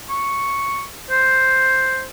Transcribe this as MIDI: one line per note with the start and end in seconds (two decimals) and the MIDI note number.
0.09 0.83 85
1.10 2.04 72